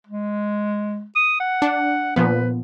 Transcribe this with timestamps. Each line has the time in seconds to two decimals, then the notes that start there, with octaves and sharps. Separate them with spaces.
0.07 G#3
1.16 D#6
1.40 F#5
1.62 D4
2.16 A#2 F3 B3 B4